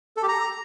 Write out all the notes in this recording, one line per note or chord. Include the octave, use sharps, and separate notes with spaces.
A4
G4
A#5